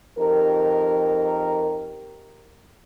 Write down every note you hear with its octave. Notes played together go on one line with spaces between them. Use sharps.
F2 D#4 G4 A#4